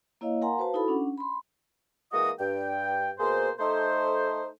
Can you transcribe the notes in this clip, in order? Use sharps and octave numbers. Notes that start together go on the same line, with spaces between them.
A#3 E4 C#5 D#5 F5
A#4 F5 F#5 G#5 A#5 C6
F#4 B4 C5 F5 A5
D#4 E4 F#4 A4 B5
C#4 D4 F#5
B5 C6
E3 G#3 A#3 F#4 D#5 D#6
G2 G5
B2 A#3 G#4 C5
A3 D#4 A4 C5